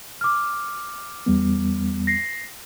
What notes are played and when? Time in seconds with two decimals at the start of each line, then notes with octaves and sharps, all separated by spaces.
0.21 D6 F6
1.26 E2 G3 B3
2.07 A#6 C7